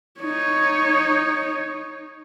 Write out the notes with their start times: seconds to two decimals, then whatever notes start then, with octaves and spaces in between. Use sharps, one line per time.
0.21 D#4 C#5